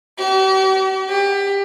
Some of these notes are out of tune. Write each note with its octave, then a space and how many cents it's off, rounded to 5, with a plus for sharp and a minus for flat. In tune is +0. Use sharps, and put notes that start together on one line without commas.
G4 -45
G4 +25